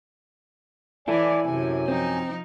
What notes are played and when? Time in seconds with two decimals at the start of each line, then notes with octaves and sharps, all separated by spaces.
1.08 E3 E4 A4 D5 G#5
1.45 F#2 C3 G#5
1.88 F3 C4 D#4